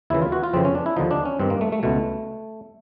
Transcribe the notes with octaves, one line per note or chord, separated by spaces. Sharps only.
D#2 C#3 E3 E4
F4
F#4
F4
F2 C#3 E3 C4
C#4
D4
E4
D#2 D3 F3 D#4
D4
C#4
G2 D#3 C4
A#3
A3
A3
C#2 B2 A3